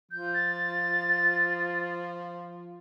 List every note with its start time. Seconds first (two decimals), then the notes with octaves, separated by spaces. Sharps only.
0.12 F3 G6
0.34 A6